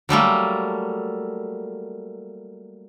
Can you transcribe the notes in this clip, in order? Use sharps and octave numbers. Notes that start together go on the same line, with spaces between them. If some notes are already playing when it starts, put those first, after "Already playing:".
F#3 G3 A3 A#3